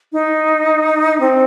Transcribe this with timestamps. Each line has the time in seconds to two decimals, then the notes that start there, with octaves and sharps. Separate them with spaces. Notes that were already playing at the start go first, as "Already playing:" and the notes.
0.13 D#4
1.20 C4